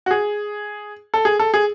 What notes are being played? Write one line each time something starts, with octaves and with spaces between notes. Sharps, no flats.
F#4
G#4
A4
G#4
A4
G#4